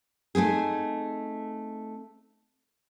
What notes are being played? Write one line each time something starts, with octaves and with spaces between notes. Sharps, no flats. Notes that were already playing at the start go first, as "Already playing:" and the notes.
A3 C4 D#4 G#4